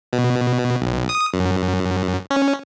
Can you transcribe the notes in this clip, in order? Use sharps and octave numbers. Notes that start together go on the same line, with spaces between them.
B2
B1
D#6
F#2
C#4